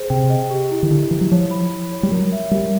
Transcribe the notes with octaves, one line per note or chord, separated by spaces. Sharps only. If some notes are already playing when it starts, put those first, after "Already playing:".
Already playing: G#4 C5
C3 G5
D#5
G4
E4
D#3
D3 E4
E3 E4
F#3
F3 C#5
B5
B5
C#5
G3
F#3 A#4
E5
G3 A#4